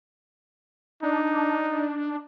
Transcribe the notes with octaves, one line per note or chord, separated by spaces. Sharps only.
D4 D#4